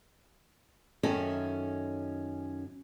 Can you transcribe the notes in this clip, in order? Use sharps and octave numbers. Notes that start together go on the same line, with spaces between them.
F#2 D#3 C#4 D#4 A4 E5